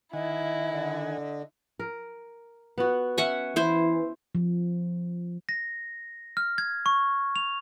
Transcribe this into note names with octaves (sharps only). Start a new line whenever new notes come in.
D#3 E4 D#5 F#5 G#5
D3
A#4
B3 F#4
C#4 E5 F#5 G#5
E3 E4 C5
F3
A#6
F6
G#6
C#6
F7